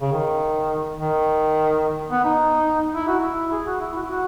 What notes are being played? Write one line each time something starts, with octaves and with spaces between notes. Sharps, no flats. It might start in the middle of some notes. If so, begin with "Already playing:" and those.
C#3
D#3
D#3
B3
D#4
E4
F#4
E4
G#4
F#4
E4
F#4
E4
F#4